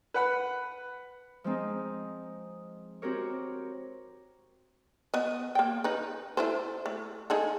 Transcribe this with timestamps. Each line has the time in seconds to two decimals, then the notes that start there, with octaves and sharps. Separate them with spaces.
0.14 B4 F#5 B5
1.44 F3 G#3 C4 D#4
3.02 C4 F#4 G4 A#4 C#5
5.14 B3 D#5
5.55 A#3 G5
5.84 D#4 B4
6.37 E4 A4 C5
6.86 A3
7.30 D#4 G#4 A4